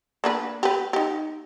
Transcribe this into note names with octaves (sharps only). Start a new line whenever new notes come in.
A#3 D4 B4
G4 B4
D#4 G4